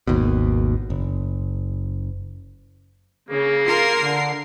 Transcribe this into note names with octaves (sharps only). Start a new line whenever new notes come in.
G#1 D#2 B2
F#1
C#3 A#3
F4 A#4 C6 C7
D3